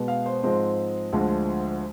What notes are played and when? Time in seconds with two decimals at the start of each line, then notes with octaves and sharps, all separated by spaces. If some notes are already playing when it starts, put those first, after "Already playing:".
Already playing: B2 G#3 B3
0.08 F5
0.26 C5
0.43 G#2 F3 G#3 C4
1.12 D2 D3 F3 G#3